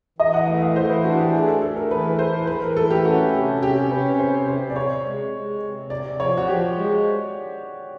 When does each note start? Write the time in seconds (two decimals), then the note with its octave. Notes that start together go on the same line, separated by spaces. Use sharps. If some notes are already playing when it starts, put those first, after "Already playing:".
0.19 E3 D#5
0.34 F#5
0.47 A3 F#5
0.58 E5
0.62 F5
0.76 E3 C5
0.90 B4
1.04 D4 F#4
1.19 G4
1.33 A3 G#4
1.47 A4
1.62 A3 A4
1.76 A#4
1.91 E3 B4
2.19 E3 C5
2.47 E3 B4
2.62 A#4
2.76 A3 A4
2.91 G4
3.05 C#4 F#4
3.34 C3 G4
3.62 C#4 G4
3.91 C#4 B4
4.19 C3 C5
4.48 C3 C5
4.70 D5
4.76 C3 C#5
5.04 G#3
5.33 G#3
5.62 C3
5.90 C3 D5
6.19 F3 C#5
6.37 F#4
6.48 F3 G4
6.76 G#3